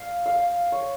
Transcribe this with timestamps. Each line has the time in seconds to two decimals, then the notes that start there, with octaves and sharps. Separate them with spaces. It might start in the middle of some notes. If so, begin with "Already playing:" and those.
Already playing: F5
0.26 F5
0.72 C#5